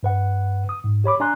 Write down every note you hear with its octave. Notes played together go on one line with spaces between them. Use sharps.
G2 B4 F#5
D#6
G#2
G4 C#5 B5 D6
D4 D5 G#5 A#5 C6 F#6